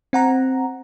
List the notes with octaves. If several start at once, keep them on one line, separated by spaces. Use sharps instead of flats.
C4 F#5 A#5